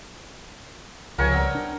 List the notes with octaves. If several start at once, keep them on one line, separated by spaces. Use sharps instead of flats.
C#2 G#2 C3 F3 A#4 C#5 G#5
G3 B3 C4
D4